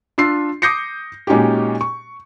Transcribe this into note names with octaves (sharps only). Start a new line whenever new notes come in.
D4 F4 E6 C7
D6 D#6 G6 A#6 C7 C#7
A#2 G#3 C#4 D#4 F#4 G4
C#6